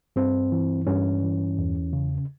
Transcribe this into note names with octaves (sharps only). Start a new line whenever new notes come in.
G2 C4
E3
G2 C#4
E3
E2
C#3